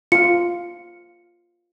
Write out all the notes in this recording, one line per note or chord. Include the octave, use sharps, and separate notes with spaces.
F4 F5 C#7